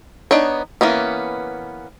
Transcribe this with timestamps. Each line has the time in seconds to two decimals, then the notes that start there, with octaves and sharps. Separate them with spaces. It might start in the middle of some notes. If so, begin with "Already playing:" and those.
0.31 B3 D4 D#4 C#5
0.81 E3 A#3 B3 C#4